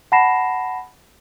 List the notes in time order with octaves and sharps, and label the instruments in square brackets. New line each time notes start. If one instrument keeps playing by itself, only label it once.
[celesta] F#5 A5 B5 A#6 C7 E7